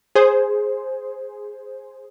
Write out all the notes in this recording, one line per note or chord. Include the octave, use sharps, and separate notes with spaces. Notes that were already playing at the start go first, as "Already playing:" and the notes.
G#4 C5